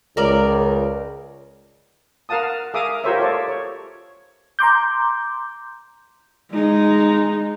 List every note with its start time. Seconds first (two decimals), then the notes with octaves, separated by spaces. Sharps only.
0.17 C#2 A#4 D5
2.29 A#4 F5 F#5 A5 D#6
2.74 G#4 A#4 E5 F5 D6 D#6
3.04 F4 G4 A#4 C5 C#5 E5
3.19 F4 A4 C#5 D5
3.48 C#5
4.59 A#5 C6 D6 G6
6.52 G#3 D#4